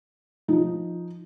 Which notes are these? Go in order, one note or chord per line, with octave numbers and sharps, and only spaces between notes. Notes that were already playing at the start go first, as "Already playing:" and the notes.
F3 D#4